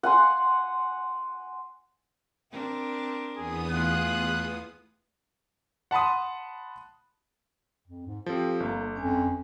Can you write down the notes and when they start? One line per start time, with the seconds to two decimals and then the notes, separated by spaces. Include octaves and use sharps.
0.03 F#5 G#5 C6
2.52 C4 D4 A#4
3.36 E2 B3 G#4 D#6
3.69 A3 F4 G#4 F#6
5.91 F#5 A5 B5 C6 D#6
7.87 F2
8.06 G#2
8.26 F3 C4 G4 A4
8.60 G1 A#3
8.96 F2 C#4 G#5